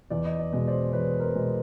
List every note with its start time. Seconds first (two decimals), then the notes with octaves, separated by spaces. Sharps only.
0.10 E2 D5
0.25 D#5
0.39 D5
0.52 B2 G#3 D#5
0.67 C5 D5
0.93 E2 B4 C#5
1.20 A#4 C5
1.34 B2 G#3